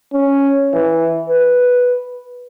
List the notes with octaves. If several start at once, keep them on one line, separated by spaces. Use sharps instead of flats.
C#4
E3
B4